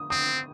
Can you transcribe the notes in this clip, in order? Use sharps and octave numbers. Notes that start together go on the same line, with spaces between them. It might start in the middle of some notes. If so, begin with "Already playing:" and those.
Already playing: D#6
C4 D#6